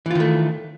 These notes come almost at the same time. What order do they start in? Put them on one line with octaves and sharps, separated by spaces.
E3 F4 D#3 A3